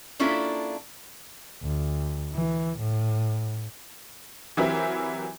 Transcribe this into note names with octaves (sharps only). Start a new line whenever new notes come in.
A#3 C#4 D4 E4 F4 A4
D2
E3
A2
E3 F#3 C4 E4 G4 A#4